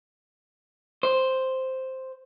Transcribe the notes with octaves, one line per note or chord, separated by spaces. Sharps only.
C5